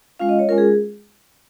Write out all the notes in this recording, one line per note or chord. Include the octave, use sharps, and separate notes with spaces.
G#3 C#4 F4 F5
D#5
C#5
G#3 C#4 F4 A#4
G#4